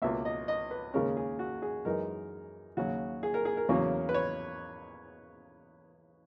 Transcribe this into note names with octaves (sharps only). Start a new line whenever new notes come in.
C#2 B2 A#3 E5
D#5
D#5
B4
D#2 C#3 G#3 C#4 A#4
G#4
F#4
G#4
F#2 E3 G#3 D#4 A#4
D#2 C#3 F#3 F#4
G#4
A#4
G#4
A#4
E2 C#3 F#3 A#3 C#4
B4
C#5